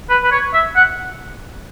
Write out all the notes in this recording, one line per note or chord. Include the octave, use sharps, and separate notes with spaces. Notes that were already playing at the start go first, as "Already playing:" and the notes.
B4
B4
C#5
E5
F#5